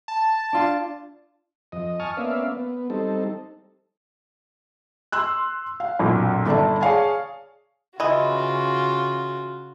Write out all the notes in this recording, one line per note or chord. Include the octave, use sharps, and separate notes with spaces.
A5
D4 F4
F2 D#5
G#5 A5 C#6 D#6 F6
A#3 B3 C#4 D5 E5 F5
B3
G3 C4 D#4 A4
C6 E6 F#6
F5
B1 F#2 A#2
G1 A4 D5 A5
G#4 C#5 D5 F5 G#5 A5
C#3 E3 F4 F#4 D#5